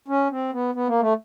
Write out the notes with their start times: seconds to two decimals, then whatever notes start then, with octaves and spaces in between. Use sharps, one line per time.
0.08 C#4
0.31 C4
0.53 B3
0.75 B3
0.88 A#3
1.01 A3